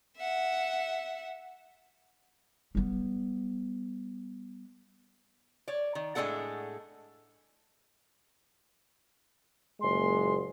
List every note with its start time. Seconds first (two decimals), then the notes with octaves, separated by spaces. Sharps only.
0.18 E5 F#5
2.75 G3 B3
5.68 C#5 D5
5.95 D#3
6.15 A2 G#3 C4 D4 A4 F#5
9.80 F#1 A#2 G#3 C6